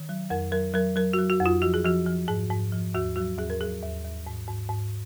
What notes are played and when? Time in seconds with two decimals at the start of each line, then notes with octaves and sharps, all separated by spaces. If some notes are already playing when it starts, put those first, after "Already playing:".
Already playing: D#3
0.09 F#3
0.30 F2 A#4
0.52 F#3 A#4
0.74 F#3 A#4
0.96 F#3 A#4
1.13 F#3 F#4
1.30 F#4
1.41 F2 F4
1.62 F3 F#4
1.74 G#4
1.85 F3 F#4
2.06 F3
2.28 G#2 G#4
2.50 G#2
2.72 F3
2.94 D#2 F#4
3.16 F#3 F#4
3.38 D#2 G#4
3.50 A#4
3.60 F#3 G#4
3.83 D#2
4.05 D#2
4.26 G#2
4.48 G#2
4.70 G#2